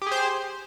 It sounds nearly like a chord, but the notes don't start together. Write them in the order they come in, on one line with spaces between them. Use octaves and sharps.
G4 G#4 C5